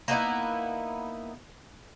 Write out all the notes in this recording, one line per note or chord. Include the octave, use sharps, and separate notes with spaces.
A#3 B3 D#4 E4